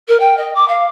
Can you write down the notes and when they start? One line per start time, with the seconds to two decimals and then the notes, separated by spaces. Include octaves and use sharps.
0.08 A#4
0.19 G5
0.37 D#5
0.55 D6
0.68 F5